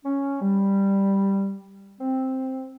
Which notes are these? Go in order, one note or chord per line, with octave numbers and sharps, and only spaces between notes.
C#4
G3
C4